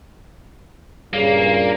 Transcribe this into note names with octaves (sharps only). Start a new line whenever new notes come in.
G2 A#2 C#3 A#3